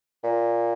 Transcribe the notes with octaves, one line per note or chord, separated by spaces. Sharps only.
A#2